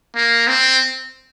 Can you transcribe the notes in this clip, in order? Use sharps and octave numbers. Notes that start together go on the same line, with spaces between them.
A#3
C4